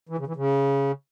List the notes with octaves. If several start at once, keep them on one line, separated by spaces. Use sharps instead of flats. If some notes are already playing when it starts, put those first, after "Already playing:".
E3
C#3
E3
C#3